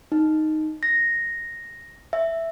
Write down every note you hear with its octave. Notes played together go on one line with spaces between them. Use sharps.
D#4
A#6
E5